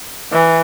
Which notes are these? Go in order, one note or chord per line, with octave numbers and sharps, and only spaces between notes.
E3